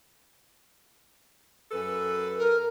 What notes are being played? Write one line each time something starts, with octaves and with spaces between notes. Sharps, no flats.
F#2 A4 B4
A#4